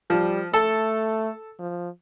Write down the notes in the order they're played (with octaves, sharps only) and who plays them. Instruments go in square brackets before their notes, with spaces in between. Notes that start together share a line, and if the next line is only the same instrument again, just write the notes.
[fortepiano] F3 [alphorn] G3
[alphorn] A3 [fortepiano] A4
[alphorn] F3